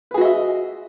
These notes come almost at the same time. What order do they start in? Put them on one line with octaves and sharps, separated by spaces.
B4 G#4 F#4 D#5 E5